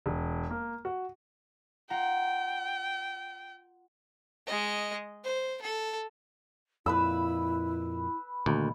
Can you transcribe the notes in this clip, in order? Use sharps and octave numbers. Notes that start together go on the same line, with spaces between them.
E1
A#3
F#4
F4 F#5 G5 A#5
G#3 D#5
C5
A4
F2 A#2 E4 B4 B5 E6
D2 A#2 D#3 A#3